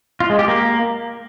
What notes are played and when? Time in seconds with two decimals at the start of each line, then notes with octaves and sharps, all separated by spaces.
0.20 F4
0.30 G#3
0.39 G4
0.48 A#3